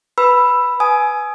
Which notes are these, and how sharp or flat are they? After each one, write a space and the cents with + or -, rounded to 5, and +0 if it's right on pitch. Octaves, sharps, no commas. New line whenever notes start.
B4 +0 B5 +0 E6 +10
G#5 +20 D#6 +0